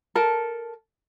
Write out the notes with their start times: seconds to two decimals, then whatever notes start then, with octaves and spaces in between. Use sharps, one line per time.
0.15 A4 A#4 A5